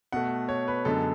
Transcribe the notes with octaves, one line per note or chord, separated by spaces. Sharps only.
B2 A3 F#5
C#5
B4
F#2 D3 G#3 B3 A4